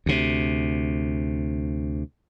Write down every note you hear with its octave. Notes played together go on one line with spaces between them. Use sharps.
D2 C3